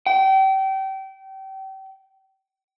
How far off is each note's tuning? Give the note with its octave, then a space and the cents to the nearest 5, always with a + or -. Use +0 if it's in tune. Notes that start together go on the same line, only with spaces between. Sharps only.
G5 -30